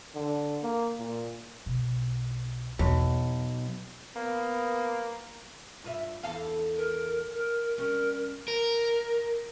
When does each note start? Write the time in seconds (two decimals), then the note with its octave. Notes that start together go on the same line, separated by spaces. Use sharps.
0.15 D3
0.63 A#3
0.99 A#2
1.66 B1
2.79 B1 E2
4.16 A#3 B3
5.84 G2 F4 E5
6.23 E2 A4 F5
6.76 A#4
7.34 A#4
7.78 G3 C#4 A#4
8.48 A#4